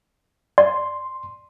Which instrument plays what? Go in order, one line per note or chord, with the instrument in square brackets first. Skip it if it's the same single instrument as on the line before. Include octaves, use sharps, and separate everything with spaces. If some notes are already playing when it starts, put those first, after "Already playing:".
[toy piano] D5 [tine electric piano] C6